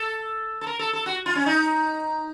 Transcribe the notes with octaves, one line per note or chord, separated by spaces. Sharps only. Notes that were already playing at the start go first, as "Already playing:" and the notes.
Already playing: A4
A4
A#4
A4
A4
F#4
F4
C#4
D#4